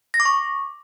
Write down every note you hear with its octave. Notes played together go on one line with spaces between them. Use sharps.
A#6
D6
C#6